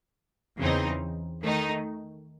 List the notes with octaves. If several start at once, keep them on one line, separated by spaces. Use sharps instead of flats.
E2 C#3 E3 C4 D#4
D#3 A3 D#4